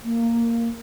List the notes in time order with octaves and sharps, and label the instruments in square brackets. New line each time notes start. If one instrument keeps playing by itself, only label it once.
[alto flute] A#3